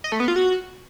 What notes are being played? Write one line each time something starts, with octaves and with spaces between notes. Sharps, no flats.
D#5
A3
B3
F4
F#4